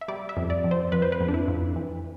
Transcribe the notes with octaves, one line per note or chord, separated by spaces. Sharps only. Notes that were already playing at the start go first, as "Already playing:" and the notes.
E5
G3 D5
E5
F2
D5
F2
C5
F2 B4
C5
B4
F2
D4
E4
F2
E3